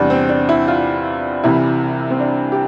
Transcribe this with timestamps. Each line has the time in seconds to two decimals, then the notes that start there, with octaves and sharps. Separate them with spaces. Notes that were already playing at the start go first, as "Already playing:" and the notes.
Already playing: E2 C3 G3 D4
0.10 C4
0.29 D4
0.49 E4
0.68 F4
1.44 C2 C3 E3 G3 E4
2.10 C4
2.20 D4
2.52 G4